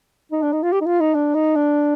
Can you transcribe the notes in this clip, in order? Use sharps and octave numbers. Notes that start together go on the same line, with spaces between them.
D#4
D4
D#4
F4
G4
D#4
F4
D#4
D4
D#4
D4